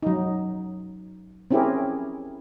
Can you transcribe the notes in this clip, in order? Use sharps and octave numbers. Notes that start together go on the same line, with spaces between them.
F#3 D#4
C4 C#4 E4 G4 G#4 A#4